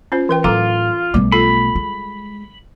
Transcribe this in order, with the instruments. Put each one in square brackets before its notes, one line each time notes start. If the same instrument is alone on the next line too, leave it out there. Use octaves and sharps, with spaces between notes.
[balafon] C#4 F4 C5
E3 B4 G5
[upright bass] A2 F#3 [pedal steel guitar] F4 [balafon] A4 A#5 D6
[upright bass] B1 A3 [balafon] G3
[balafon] F4 A4 [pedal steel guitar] B5
[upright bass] G#3